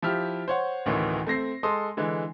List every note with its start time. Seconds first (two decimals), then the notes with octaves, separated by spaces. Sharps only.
0.02 F3 E4 G4 F6
0.48 C5 C#5 F#5
0.86 A1 D2 D#3 E3
1.27 A3 C4 A#6 C7
1.63 G#3 A4 C6 D#6
1.97 D3 E3 G#3